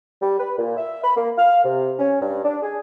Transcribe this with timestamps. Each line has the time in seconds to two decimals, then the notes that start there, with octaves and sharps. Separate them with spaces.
0.22 G3
0.39 B4
0.58 A#2
0.77 E5
1.03 B5
1.16 A#3
1.38 F5
1.64 C3
1.99 C#4
2.21 G2
2.44 D4
2.62 G#4